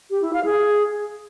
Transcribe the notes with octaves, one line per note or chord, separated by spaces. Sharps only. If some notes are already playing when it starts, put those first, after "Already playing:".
G4
E4
F5
G#4